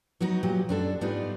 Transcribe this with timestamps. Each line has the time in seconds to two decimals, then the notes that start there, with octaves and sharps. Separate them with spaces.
0.20 F#3 B3 D#4 F#4
0.43 A#2 F#3 G4
0.69 F#2 D4 A4
1.01 G#2 G3 B3 D4 D#4 F4